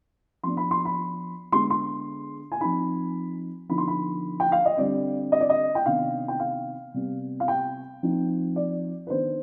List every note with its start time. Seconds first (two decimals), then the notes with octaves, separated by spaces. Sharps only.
0.44 F3 B3 D4 C6
0.57 B5
0.71 C6
0.85 B5
1.52 D3 G#3 B3 C6
1.70 C6
2.52 G#5
2.61 F3 C4 D#4 B5
3.69 D3 F3 B3 D#4 B5
3.78 C6
3.88 B5
4.40 G5
4.52 F5
4.65 D#5
4.77 D3 G3 C4 D5
5.32 D#5
5.41 D5
5.49 D#5
5.75 G5
5.86 C3 D#3 B3 D4 F5
6.28 G5
6.40 F5
6.94 C3 G3 B3
7.40 F5
7.48 G5
8.03 F3 C4 D#4
8.56 D5
9.07 B4
9.10 D#3 B3 D4 C5